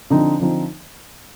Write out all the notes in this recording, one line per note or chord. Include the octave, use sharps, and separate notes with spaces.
D3 F3 C4 D#4
D3 F3 C4 D#4